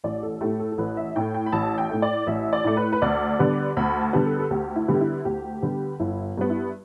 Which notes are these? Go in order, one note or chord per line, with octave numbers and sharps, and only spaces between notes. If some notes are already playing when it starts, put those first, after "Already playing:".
A1 D5
A4
A2 A3 G4
A4
A4
A1 B4
E5
A2 A3 G5
G5
B5
A1 A5
G5
A2 A3
D5
A1 E5
D5
A2 A3
B4
B4
D2 D5
D3 G3 B3
D2 B5
A5
D3 G3 B3
A4
A4
D2 G4
E4
D3 G3 B3
G4
E4
D2 G4
D3 G3 B3
G1 E4
G2 G3 B3
E4